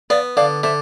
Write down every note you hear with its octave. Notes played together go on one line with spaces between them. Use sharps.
B3 D5 F5
D3 D5 F5
D3 C5 E5